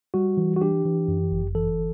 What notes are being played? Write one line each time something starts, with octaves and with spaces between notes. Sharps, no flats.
G3 F#4
E3
F#4
D4 G4
E3
F#2
G1
E3 A4